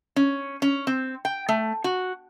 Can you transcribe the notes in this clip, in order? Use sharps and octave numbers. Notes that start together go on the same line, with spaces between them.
C#4
C#4
C4
G5
A3
F#4